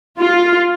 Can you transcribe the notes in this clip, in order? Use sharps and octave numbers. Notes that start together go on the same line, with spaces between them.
F4